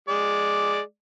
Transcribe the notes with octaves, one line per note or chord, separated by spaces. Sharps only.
G#3 D5